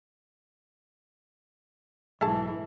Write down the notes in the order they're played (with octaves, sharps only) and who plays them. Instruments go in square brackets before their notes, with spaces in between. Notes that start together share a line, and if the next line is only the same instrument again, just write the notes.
[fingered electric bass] B1 [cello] G#2 E3 [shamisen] A3 G#4 A5